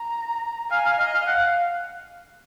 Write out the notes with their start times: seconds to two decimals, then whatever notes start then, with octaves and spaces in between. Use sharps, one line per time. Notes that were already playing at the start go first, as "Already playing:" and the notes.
Already playing: A#5
0.71 F5 G#5
0.85 F5
1.00 D#5 F5
1.14 F5
1.27 F5 F#5